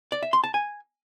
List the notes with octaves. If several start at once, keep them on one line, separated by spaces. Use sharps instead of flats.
D5
E5
C6
A5
G#5